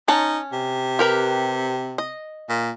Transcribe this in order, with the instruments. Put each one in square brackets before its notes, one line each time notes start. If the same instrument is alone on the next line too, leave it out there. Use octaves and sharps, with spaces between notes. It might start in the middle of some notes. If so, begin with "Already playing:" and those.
[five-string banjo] C#4 C#5 A5 [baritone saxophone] D#4
[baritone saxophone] C3
[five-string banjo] G4 A#4 B4
D#5
[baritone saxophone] A#2